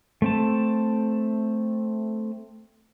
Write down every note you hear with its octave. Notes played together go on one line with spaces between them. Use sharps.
A3 C4 A5